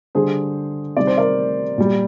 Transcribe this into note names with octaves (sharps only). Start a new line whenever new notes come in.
D3 G3 G#4 C5
C3 D#3 G3 D5
C5
A#4 D5
A#2 G3